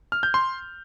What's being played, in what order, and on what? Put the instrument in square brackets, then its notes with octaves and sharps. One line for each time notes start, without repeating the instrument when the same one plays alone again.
[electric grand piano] F6
G6
C6